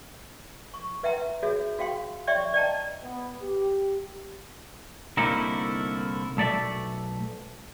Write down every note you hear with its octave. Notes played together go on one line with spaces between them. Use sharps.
C#6
B4 E5 F#5 G5 A#5 C6
F#4 G#4 C#5 E5
F#4 F5 G5 C6
C#5 D5 E5 G5 C6 C#6
D5 D#5 G5 A5 A#5
B3
G4
C2 D3 A3 A#3 D#4 E4
B1 A3 D5 E5